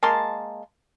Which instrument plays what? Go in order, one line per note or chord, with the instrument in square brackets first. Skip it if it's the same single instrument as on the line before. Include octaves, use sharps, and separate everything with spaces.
[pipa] G#3 A#3 A5 C6